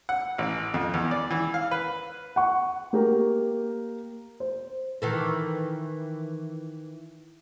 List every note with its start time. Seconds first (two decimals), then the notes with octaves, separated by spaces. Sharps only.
0.09 F#5
0.38 A1
0.74 F2
0.94 E2
1.11 D5
1.30 E3
1.54 F5
1.71 B4
2.36 F#5 C#6
2.93 A#3 G4 A#4
4.40 C5
5.02 D#3 E3 A4